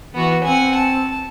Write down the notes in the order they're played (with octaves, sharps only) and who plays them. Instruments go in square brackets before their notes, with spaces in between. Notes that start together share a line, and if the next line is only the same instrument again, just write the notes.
[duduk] E3 [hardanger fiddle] B3 F#4
[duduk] C4 [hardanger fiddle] F#5 G#5
[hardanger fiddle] A5